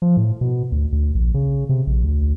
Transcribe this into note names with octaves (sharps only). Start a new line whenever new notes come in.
F3
A2
B2
D2
D2
A#1
C#3
C3
A#1
D2